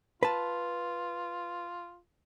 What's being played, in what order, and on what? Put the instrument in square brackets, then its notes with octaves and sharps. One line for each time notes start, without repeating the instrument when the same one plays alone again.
[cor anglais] F4 [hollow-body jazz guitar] B4 A5